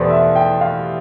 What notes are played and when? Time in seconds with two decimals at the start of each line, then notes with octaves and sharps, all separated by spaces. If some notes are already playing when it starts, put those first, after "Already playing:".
Already playing: E2 B2 A3 G4 B4 C5 D5
0.10 E5
0.35 G5
0.61 F5